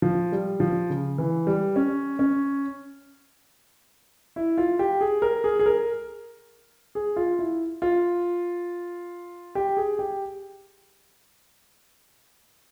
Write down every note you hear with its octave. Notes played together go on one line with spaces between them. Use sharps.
F3
G3
F3
C#3
E3
G3
C#4
C#4
E4
F4
G4
G#4
A#4
G#4
G#4
A#4
G#4
F4
E4
F4
G4
G#4
G4